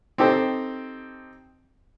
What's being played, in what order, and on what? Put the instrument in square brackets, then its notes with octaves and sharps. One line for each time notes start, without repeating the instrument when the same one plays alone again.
[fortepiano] C4 D#4 G4 A4 C5